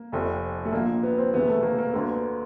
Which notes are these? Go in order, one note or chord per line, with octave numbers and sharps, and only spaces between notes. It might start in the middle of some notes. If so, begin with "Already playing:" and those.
Already playing: A#3
F1 F2 C3
A3
A#1 A#2 A#3
B3
C4
E1 E2 C3 B3
A3
A#3
A#3
D2 D3 A#3
B3